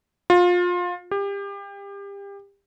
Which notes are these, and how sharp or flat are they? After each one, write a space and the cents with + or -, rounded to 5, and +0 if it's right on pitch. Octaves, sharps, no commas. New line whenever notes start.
F4 +25
G4 +30